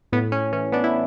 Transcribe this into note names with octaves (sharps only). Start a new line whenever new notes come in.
A2 B3
C#4
E3 C#4
B3 D4
E4